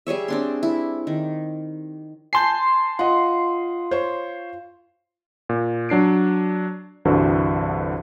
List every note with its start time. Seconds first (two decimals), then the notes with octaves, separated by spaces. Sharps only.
0.07 G3 G#4 C#5 E5
0.28 C4 D4 C6
0.63 E4
1.07 D#3
2.33 G#5 A5 C6 G6 C7
2.99 F4 D#5 F#5
3.91 C5 C#5
5.49 A#2
5.89 F#3 D4 C7 D7
7.05 C2 G2 D3 E3 F#4 C5